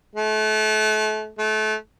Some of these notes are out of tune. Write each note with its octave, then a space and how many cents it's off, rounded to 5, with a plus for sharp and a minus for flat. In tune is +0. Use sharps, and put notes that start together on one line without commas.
A3 -35
A3 -30